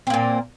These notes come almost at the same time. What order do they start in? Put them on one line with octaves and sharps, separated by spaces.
C4 A#3 A#2